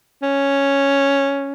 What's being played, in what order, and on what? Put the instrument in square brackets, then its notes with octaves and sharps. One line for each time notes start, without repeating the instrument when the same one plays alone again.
[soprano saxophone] C#4